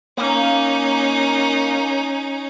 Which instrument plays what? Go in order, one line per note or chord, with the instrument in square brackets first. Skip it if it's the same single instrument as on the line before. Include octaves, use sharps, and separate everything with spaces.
[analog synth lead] A#3 [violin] C#4 D#4